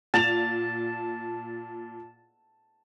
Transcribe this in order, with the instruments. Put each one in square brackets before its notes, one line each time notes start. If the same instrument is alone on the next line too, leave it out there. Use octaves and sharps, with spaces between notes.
[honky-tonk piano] A#2 F7 [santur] A5